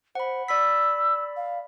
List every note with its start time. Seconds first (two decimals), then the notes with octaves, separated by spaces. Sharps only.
0.15 C5 F#5 B5
0.48 D5 B5 E6 B6
1.36 F5